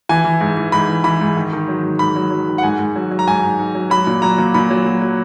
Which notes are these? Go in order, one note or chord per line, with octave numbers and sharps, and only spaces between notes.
E3 G#5
E3
G#2
E3
G#2 B5
E3
E3 B5
G#2
D#3
D#3
F#3
G#2
G#2 B5
F#3
F#3
D#3
F#5
G#2 G#5
G#2
F#3
F#3
A#5
G#2 G#5
G#2
G#2
F#3
F#3 B5
A#2
F#3 A#5
A#2
A#2 B5
F#3
F#3
F#3